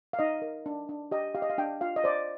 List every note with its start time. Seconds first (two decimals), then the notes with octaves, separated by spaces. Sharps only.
0.13 F5
0.19 D#4 D#5
0.42 A#4
0.66 D4
0.89 D4
1.11 G4 D#5
1.35 G4 F5
1.42 D#5
1.50 F5
1.58 D4 G5
1.81 F4 F5
1.96 D#5
2.04 C5 D5